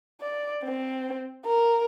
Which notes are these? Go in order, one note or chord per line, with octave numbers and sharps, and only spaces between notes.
D5
C4
A#4